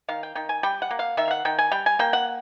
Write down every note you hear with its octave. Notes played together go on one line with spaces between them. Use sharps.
D#3 F5
G5
D#3 G5
G#5
G3 G5
F#5
A#3
F5
D#3 E5
F5
F#5
D#3 G5
G#5
G3 G5
G#5
A#3 G5
F#5